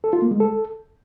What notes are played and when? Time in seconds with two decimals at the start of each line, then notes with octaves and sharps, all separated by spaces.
0.04 A4
0.13 F4
0.22 A#3
0.31 G#3
0.40 A4